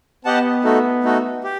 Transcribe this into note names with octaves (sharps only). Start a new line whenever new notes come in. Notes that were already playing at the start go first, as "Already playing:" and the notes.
B3 G4 D#5 F#5 A5
A3 D#4 F#4 A4
A3 D#4 F#4 A4
G4